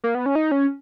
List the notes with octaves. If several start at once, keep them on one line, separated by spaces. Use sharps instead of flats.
A#3
B3
C#4
D#4
C#4